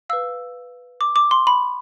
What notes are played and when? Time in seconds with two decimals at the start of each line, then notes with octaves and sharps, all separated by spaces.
0.09 B4 F5 E6
1.01 D6
1.16 D6
1.31 C6
1.47 B5